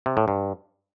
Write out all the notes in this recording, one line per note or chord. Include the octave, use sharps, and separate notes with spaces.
C3
A2
G2